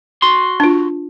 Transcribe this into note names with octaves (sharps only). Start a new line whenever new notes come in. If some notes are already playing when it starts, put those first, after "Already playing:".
F#4 C6
D4 F4